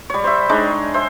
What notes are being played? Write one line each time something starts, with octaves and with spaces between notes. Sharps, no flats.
G3 C#5
C5 E5
G#3 D4 D#4 C#5
C5 E5